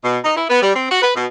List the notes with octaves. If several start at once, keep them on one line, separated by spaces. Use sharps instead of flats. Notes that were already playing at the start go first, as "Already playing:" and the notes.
B2
D#4
E4
B3
G3
C4
F#4
B4
B2